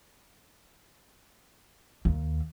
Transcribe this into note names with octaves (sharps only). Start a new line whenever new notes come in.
D#2